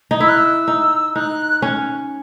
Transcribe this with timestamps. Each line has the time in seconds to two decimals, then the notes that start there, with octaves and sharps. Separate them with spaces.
0.11 D#4
0.20 E4 E6
0.29 F#6
0.38 E6
0.68 D#4
1.15 D#4 F#6
1.62 C#4